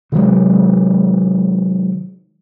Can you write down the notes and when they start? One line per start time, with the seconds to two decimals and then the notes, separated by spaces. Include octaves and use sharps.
0.12 C3 D#3 F#3 G#3